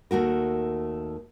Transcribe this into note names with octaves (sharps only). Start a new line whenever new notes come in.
D#2 A3 F#4 A#4